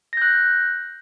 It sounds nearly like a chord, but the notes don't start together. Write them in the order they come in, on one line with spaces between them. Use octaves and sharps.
A#6 G6 F#6